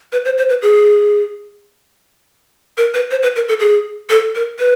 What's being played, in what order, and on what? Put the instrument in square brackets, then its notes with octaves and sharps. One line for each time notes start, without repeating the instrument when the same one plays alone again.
[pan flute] B4
C5
C5
B4
G#4
A#4
B4
C5
B4
A#4
A4
G#4
A4
A#4
B4